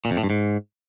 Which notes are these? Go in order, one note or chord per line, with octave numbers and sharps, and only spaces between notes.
A#2
F2
A2
G2
G#2